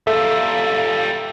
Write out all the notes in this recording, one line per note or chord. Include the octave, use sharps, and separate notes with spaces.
G3 F4 A4 E5